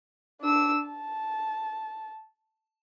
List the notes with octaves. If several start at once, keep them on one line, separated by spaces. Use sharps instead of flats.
D4 E6
A5